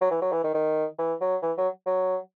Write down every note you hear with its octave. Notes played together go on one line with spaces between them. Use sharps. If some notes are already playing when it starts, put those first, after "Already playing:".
F#3
E3
F#3
E3
D#3
D#3
E3
F#3
E3
F#3
F#3